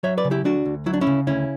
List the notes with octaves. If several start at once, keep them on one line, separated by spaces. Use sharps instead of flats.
F#3 C#5 E5
B4 D5
C#3
E4 G4
D2 D4 F#4
D2
F#3 E4
D4
C#4 E4
C#3
D2 C#4 E4